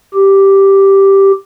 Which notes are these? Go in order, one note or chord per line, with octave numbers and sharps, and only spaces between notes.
G4